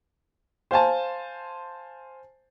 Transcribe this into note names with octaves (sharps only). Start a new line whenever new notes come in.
C5 F5 G#5 A5